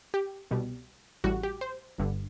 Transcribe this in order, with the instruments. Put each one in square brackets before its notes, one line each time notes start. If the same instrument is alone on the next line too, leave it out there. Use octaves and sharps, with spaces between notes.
[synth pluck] G4
C2 B2 G3
A1 A2 G3 F#4
G4
C5
G1 G2 D3